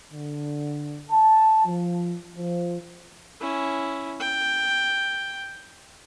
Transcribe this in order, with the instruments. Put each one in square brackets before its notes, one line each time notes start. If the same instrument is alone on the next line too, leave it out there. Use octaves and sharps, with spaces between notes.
[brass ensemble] D3
A5
F3
F3
[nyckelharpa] C#4 E4
G5